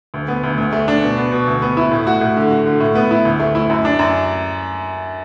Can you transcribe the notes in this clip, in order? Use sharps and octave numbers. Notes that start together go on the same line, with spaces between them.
D2
B3
D2
D2
A3
D4
B2
B3
B2
D2
B3
E4
A2
F#4
A2
D3
F#4
D3
A2
B3
E4
D2
A3
E4
F#2
D4
F#2